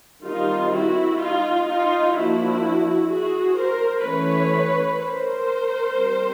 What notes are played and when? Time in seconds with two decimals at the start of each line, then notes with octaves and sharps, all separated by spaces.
0.24 D#3 G3 C4 D#4 F4
0.72 E4 F#4
1.19 D#4 F4
1.66 D#4 F4
2.13 F3 A#3 D4 E4 F#4
3.08 F#4 G#4
3.56 A#4 C5
4.04 E3 A3 C#4 B4 C#5
4.98 A#4 C5
5.94 G3 C4